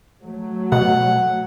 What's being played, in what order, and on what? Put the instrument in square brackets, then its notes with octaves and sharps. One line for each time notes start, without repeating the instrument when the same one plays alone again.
[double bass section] F#3 A3
[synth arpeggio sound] B2 [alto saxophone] F#5